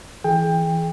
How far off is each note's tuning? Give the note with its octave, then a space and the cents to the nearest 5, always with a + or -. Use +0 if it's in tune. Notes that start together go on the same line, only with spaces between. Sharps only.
E3 +0 G#4 +20 G5 +20